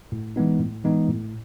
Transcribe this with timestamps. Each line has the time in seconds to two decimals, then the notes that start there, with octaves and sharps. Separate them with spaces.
0.12 A2
0.36 E3 G#3 B3 D#4
0.60 A2
0.84 E3 G#3 B3 D#4
1.09 A2